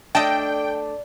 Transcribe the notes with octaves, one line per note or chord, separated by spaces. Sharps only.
A3 D4 D5 D#5 G5 A5